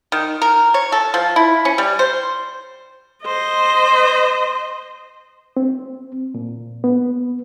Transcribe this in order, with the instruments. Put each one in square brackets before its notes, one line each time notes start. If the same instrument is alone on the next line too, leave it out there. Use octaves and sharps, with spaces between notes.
[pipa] D#3
A#4
C#5
A4
F3
E4
C#4
G3
C5
[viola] C5 D#5
[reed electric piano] C4
A#2
B3